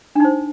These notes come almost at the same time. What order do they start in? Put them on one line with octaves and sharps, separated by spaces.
D4 D#4 C5